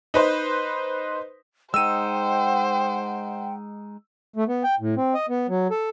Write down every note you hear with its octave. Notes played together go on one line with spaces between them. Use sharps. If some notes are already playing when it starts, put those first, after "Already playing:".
D#4 B4 C5
G#3 D#4 C5 F#5 G5 E6 D#7
A3
B3
G5
A2
C4
D#5
B3
F#3
A4